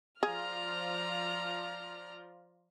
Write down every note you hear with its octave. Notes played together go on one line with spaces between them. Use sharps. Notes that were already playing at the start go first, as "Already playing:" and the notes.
F3 F4 G#4 D5 A#5 F6